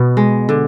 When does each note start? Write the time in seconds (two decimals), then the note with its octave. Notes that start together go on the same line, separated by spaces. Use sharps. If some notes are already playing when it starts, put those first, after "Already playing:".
Already playing: B2 B3
0.17 G#3
0.49 D3